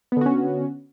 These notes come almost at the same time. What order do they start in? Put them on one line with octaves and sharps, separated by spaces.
B3 D3 F#4 C#4